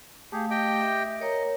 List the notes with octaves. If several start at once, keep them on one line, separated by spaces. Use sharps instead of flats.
A3 G4 G#4 F5
G4 D#5 G5
E5
A#4 C#5 D#5 A#5